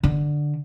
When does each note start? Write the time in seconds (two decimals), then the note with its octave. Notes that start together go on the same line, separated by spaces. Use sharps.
0.03 D3